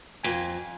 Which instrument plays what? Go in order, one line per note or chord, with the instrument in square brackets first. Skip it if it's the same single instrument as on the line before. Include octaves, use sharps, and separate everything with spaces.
[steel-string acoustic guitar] F2 [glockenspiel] G#5 G#6